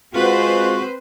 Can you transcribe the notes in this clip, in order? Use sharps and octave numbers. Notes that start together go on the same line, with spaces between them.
G#3 C4 F4 F#4 B4 C5